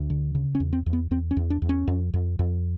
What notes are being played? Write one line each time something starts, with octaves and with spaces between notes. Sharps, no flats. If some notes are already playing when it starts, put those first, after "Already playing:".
Already playing: D2
D3
C#3
C#4
E2
C4
E2
B3
E2 C4
C#4
E2
D4
E2
C#4
F2
F2
F2